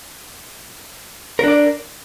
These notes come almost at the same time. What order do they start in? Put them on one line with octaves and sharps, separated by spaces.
A#4 D4 D5